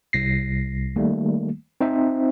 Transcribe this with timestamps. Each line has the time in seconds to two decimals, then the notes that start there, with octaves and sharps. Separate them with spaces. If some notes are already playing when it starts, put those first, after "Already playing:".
0.13 C2 A#6 C7
0.96 D#3 G3 A3 A#3
1.81 C4 D#4 C5 E5